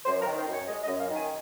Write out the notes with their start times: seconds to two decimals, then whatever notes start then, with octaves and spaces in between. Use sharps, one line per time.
0.05 F#2 C5
0.21 A#4
0.26 D#3
0.37 C5
0.47 F#2
0.53 C#5
0.68 G#3 D#5
0.83 D#5
0.88 F#2
0.99 F5
1.10 D#3 G#5